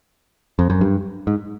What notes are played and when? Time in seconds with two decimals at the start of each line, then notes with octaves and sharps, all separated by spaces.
0.59 F2
0.70 F#2
0.81 G2
1.27 G#2